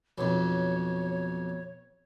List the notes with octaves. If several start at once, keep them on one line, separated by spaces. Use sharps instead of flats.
B1 F2 C#5